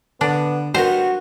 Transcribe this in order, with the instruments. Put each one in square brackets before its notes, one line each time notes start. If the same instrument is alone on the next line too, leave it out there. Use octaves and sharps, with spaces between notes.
[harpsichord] D3 [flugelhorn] B3 [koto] D4
[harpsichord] G3 B3 A#4 [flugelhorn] F#4 [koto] C5